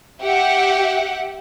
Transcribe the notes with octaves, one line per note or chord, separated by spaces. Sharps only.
G4 E5 F#5